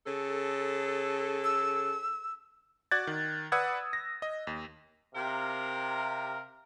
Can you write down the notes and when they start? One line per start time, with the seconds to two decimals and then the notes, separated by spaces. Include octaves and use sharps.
0.05 C#3 A4
1.44 E6
2.91 F#4 D5 F#6 G#6 A6
3.07 D#3
3.52 B4 D5 F#5 D#6 E6 G#6
3.93 A#6
4.22 D#5
4.47 D#2
5.14 C3 A#4 F5